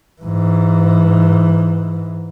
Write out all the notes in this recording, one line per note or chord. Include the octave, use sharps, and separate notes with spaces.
G#2 E3